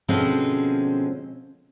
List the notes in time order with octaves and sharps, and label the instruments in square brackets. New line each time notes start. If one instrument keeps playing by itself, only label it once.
[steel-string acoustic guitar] B2 D3 F3 G#3 C4 C#4